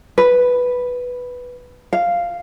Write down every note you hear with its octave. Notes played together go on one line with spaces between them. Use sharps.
B4
F5